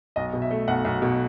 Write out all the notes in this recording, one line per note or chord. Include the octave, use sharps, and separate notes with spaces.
B1 D#5
B2
E5
A3
B1 F#5
B1
B2